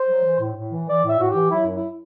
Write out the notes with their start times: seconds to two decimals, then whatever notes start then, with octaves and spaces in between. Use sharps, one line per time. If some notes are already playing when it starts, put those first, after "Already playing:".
Already playing: C5
0.08 F#3
0.24 E3
0.40 A2
0.56 A2
0.71 E3
0.87 E3 D5
1.04 A2
1.09 E5
1.19 A2 F#4
1.31 E3 G4
1.51 F#3 E4
1.67 F#2
1.73 E4